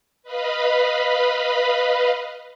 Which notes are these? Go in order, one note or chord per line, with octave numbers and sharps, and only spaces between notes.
B4 D#5 F5 B5